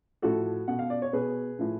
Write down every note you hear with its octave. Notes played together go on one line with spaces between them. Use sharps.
A2 F3 F#4 A4
B2 F#5
F5
D5
C#5
B2 G#4 B4
A2 F3